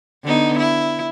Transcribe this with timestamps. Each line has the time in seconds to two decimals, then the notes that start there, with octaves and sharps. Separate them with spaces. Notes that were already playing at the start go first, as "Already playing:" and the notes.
0.24 D3 B3 D#4
0.59 E4